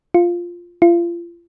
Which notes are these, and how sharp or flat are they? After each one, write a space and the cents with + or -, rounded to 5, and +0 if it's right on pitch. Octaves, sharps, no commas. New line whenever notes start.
F4 +0
F4 -35